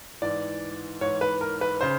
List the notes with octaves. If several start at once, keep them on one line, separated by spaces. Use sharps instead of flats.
G#2 E3 D5
G#2 E3 C#5
B4
A#4
B4
C#3 C5